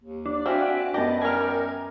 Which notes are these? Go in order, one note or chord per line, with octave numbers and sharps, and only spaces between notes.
D#2
D4
C4 E4 F#4 E5 F5 G5 G#5
D5 F#5
F#2 B3 G4 D#5 A5 A#6
D#3 G3 A#4 G#5 F6